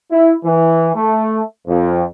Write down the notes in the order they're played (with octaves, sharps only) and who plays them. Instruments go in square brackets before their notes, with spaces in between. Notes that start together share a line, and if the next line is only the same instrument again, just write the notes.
[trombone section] E4
E3
A3
F2